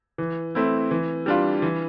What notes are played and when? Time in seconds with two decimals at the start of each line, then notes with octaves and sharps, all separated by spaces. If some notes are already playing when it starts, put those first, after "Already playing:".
0.18 E3
0.55 A3 C4 E4
0.91 E3
1.26 G3 D4 F4
1.62 E3